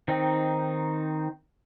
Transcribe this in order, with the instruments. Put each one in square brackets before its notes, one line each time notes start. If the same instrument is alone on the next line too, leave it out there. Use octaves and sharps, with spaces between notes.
[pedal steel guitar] D#3 C4 D#4